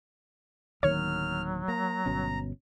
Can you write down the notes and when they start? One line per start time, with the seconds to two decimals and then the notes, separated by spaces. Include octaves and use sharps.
0.83 D1 D#3 F#3 A#3 C#5 F6
1.68 A#3 A#5
2.06 G1 B2 C#4